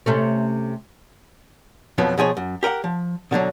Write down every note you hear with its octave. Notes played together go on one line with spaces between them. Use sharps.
C3 A3 C#4
F2 B2 F3 F#3 B3
B2 F3 G#4 C#5
F#2
G4 A#4 D#5 F#5
F3
B2 D3 D#3 F#3